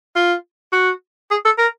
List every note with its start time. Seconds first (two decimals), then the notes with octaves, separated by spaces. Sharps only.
0.16 F4
0.72 F#4
1.31 G#4
1.45 A4
1.58 A#4